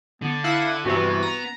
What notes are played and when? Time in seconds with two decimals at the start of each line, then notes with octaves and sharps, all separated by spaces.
0.22 D3 B3
0.44 E4 F5 F#5 D#7
0.85 G2 C3 E3 B3 F#4
1.23 A#5